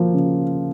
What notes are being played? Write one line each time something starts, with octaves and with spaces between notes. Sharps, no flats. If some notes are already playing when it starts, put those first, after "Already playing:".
Already playing: F3 A#3
C#3